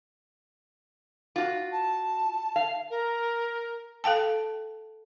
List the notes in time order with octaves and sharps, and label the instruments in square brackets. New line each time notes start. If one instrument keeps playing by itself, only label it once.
[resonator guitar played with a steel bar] F4 F#4
[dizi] A5
[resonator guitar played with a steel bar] F5
[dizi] A#4
[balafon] A4 F5 G5 A5